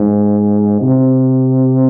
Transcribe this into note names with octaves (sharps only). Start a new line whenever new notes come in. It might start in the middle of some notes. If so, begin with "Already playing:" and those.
Already playing: G#2
C3